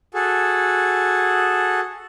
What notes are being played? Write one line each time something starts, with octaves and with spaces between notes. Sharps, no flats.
F#4 G#4 A4